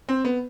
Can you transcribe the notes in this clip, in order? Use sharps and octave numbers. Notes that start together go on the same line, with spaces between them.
C4
B3